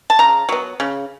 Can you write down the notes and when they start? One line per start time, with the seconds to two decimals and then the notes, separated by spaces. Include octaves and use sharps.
0.10 A5
0.19 C#3 A#5
0.49 F#3 B3
0.80 C#3